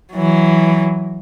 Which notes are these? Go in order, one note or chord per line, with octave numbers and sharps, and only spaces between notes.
E3 F#3